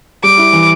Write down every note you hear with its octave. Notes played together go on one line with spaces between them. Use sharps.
G3 D6
E4
E3